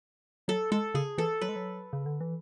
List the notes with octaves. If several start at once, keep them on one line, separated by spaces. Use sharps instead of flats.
F#3 A4
G#3 A4
C#3 G#4
E3 A4
F#3 B4
G#3
F#3
C#3
D3
E3